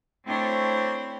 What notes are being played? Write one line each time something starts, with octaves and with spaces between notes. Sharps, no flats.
A3 C4 D4 E4 C5 C#5